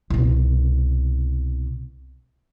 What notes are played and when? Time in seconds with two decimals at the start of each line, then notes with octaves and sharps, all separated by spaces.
0.10 C2 B2